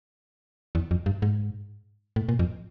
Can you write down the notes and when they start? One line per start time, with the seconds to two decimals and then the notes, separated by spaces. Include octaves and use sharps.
0.75 E2
0.91 F2
1.06 G2
1.22 G#2
2.16 A2
2.29 A#2
2.39 F2